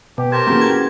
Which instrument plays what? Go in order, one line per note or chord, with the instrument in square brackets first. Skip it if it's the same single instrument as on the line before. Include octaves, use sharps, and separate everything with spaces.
[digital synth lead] B2 [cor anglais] G4
[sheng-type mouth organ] G4 A#4 A5 [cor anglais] C5 [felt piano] G#6
[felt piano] C#3 E3 F#3 [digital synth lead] A#3
[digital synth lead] G#6